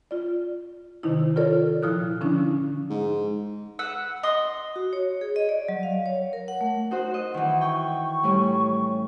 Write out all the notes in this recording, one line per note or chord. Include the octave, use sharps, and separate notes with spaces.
F4 D5
C3 D#3 D#4 E4
F4 A4 A#4 C#5 D5
A#2 F3 E4 D#6 F6 F#6
D3 F3 C#4 D4 E4
G#2
B4 F#5 E6
D#5 C6 D#6
F#4
C#5
G#4
D#5
D5
F#3
F5
C#5
A#4
F#5
A3
D#4 F#4 C5
D#5 F#5
D#3 E3 F#5
G5 C#6
A2 G3 C#4